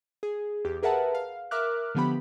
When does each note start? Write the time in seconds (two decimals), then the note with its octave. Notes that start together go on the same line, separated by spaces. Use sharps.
0.23 G#4
0.65 E2 G4
0.83 G#4 A#4 B4 E5 F#5 A5
1.15 F5
1.51 A#4 E5 D6 F6 F#6
1.95 D3 F3 B3 G4 B5